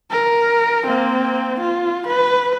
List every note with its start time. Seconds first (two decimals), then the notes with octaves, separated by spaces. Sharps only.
0.11 A#4
0.86 A#3 C4
1.61 F4
2.07 B4